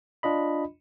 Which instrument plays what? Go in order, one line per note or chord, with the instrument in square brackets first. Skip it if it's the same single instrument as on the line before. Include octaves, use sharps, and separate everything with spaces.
[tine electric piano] D4 F4 D#5 B5